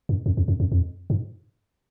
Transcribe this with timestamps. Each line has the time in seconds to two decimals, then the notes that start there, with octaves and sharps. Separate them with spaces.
0.09 F#2
0.26 F2
0.37 E2
0.48 F2
0.60 F2
0.72 E2
0.76 F2
1.10 G2